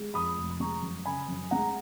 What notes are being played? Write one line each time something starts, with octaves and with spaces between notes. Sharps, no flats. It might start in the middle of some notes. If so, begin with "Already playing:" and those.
Already playing: G#3
F2 B5 D#6
F1
B5
G#3 A#5 C#6
F#2
C#3 G#5 B5
F#2
G#3 F#5 A#5